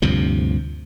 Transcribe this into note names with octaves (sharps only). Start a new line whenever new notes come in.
D2 G2 C3 F3